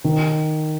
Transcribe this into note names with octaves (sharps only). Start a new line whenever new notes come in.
D#3